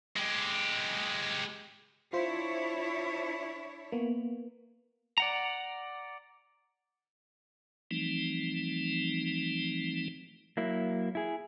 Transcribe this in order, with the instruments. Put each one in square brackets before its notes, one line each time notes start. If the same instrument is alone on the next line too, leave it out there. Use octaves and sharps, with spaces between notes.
[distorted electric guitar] G#3 G4
[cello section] D4 E4 C#5 [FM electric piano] F4 C5
[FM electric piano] A#3 B3
[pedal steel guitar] D5 F#5 A#5
[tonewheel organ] E3 F3 G3 A3 C4 D#4
[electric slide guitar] F#3 A#3 E4
E4 G#4